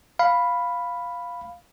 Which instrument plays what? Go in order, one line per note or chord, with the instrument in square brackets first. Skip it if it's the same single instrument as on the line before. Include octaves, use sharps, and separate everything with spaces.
[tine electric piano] F5 B5